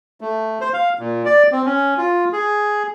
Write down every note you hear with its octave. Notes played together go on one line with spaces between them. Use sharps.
A3
C5
F5
A#2
D5
C4
C#4
F4
G#4